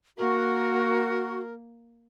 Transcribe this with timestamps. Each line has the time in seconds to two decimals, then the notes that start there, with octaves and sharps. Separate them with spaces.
0.17 A#3 F#4 A#4